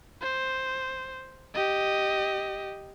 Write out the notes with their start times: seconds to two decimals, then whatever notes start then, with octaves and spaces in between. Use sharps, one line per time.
0.22 C5
1.54 G4 D#5